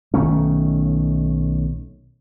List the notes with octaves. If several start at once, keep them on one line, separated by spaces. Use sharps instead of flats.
B1 D#3 A3 C#4